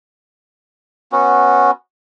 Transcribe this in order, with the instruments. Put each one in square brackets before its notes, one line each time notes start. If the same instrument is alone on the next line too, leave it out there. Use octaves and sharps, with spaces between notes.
[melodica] B3 C#4 F#4